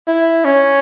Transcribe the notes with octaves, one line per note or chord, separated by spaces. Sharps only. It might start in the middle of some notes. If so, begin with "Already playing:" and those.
E4
C#4